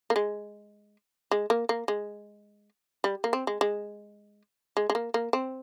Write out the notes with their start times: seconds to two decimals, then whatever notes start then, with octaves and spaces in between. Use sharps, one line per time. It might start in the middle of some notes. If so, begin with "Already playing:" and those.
0.10 A#3
0.16 G#3
1.31 G#3
1.50 A#3
1.69 A#3
1.88 G#3
3.04 G3
3.24 A#3
3.33 C4
3.47 G#3
3.61 G#3
4.77 G#3
4.90 G#3
4.95 A#3
5.14 A#3
5.33 C4